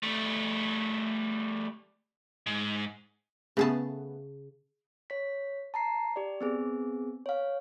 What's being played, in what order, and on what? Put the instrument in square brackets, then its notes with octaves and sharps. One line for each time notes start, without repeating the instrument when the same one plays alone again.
[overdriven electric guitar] G3 A3
G#2
[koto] C#3 G#4 A5 [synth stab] A3 B3
[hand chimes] C#5 B6
A5 A#5 C7
G4 D5
B3 C4 G#4
C#5 F5